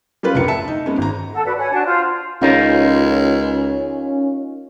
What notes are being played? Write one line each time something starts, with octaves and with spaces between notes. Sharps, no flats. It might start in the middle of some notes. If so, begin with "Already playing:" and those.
G3 C#4 F4 B4
F1 C#2 D4 A#4 C#7
E5 A5
D#4
G#3 B3 C#4
G#1 A#5
A4 F#5
F#4 B4 D5
C#5 F#5 G#5
D4 F#4 A5
F4 C5
C#2 C#4 D#4 F4 A#4